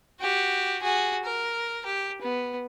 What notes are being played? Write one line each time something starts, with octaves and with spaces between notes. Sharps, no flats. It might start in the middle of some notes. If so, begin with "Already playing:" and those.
F#4 G4
F#4 G#4
A#4
G4
B3